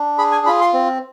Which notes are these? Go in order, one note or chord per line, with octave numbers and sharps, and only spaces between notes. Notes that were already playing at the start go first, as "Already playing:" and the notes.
Already playing: D4
G#4 B5
G#5
F4 B5
C6
C4